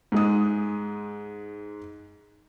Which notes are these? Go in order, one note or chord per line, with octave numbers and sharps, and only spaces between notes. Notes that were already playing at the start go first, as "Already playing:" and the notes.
G#2 G#3 D#6